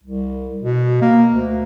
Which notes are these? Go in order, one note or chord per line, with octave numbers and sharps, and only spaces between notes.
C2
B2
A#3
D2